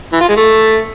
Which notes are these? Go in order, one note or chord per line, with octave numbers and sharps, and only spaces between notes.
E3
F4
G#3
A3